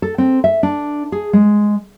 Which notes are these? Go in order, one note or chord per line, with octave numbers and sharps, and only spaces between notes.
A4
C4
E5
D4
G#4
G#3